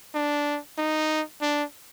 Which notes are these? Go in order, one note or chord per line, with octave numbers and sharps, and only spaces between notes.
D4
D#4
D4